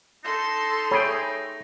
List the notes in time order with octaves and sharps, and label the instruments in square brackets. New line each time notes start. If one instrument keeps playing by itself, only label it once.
[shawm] D#4 [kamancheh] A4 C6
[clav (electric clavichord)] A3 G#4 G5 [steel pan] C#5 B5